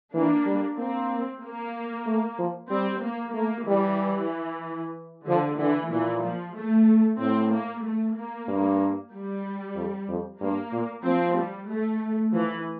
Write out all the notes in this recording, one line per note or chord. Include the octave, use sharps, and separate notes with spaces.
E3 A#3 D4
G3
A#3 C4
A#3
A3
F3
G3 C4
A#3
A3 A#3
E3 G3
D3 F3
D3 E3
A#2 E3
F3
A3
A2 C4
A#3
A3
A#3
G2
G3
F2
F2
G2 A#3
A#2
F3 C4
G3
A3
E3 F3